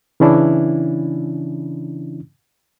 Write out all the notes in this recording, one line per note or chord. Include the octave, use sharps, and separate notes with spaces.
C#3 E3 C#4 D4 E4